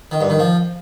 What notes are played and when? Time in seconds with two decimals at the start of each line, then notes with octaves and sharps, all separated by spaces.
0.11 D#3
0.21 G2
0.30 D#3
0.39 F3